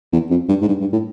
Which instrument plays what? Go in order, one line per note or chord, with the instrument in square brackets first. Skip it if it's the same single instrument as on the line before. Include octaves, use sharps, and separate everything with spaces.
[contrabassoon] E2
F2
G2
G#2
G2
G2
A2